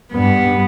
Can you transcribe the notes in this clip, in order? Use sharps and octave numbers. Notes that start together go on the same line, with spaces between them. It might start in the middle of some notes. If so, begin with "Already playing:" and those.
G2 B3